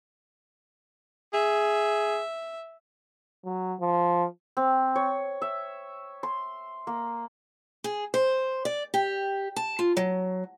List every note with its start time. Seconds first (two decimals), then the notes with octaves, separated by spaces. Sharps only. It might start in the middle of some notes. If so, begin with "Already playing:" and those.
1.34 G#4 E5
3.45 F#3
3.80 F3
4.57 C4
4.96 C#5
5.42 E5
6.23 C6
6.87 A#3
7.84 G#4
8.14 C5
8.65 D5
8.94 G4
9.56 A5
9.79 F4
9.97 F#3